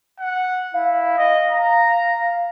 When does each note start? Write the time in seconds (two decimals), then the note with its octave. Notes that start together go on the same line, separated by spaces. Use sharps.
0.19 F#5
0.74 E4 F5
1.18 D#5
1.51 A#5